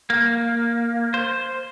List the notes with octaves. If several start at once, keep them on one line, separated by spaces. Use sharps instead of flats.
A#3
C5